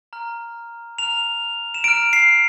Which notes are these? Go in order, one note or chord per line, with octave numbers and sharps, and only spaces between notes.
A#5 F6
A#5 F6 F7
E7
A#5 F6 D7
C7